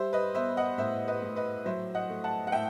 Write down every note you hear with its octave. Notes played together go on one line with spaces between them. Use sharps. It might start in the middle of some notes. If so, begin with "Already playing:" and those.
Already playing: G3 C5 E5
B4 D#5
B3 C5 E5
D#5 F#5
A2 C5 E5
B4 D#5
A2
B4 D#5
F#3 C5 E5
D#5 F#5
A3
F#5 A5
F#5
A2 E5 G5